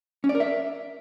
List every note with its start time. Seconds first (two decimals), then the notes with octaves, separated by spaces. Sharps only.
0.24 C#4
0.29 D5
0.35 A#4
0.40 E5